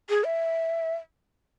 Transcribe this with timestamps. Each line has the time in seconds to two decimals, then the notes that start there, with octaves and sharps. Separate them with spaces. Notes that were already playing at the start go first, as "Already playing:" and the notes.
0.09 G#4
0.24 E5